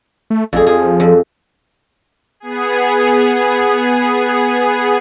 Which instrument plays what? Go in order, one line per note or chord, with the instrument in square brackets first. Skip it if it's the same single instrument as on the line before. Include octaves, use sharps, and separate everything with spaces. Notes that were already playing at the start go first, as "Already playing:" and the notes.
[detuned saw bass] A3
[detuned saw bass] A1 [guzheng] F2 G#4
[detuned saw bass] F3 [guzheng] G#4
[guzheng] F2
[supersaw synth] B3 G#4